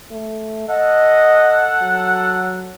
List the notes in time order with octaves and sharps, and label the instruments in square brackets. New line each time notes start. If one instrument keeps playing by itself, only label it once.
[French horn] A3
[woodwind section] A4 F#5 [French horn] D#5
[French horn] F#3